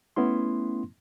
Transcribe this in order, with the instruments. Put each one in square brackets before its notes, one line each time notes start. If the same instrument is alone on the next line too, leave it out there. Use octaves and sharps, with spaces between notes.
[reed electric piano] A3 B3 C#4 E4 C6